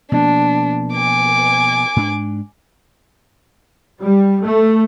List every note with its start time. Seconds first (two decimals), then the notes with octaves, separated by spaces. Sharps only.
0.12 B2 F3 A#3 D4
0.93 G#5 D6
1.96 G#2 D4
4.00 G3
4.43 A3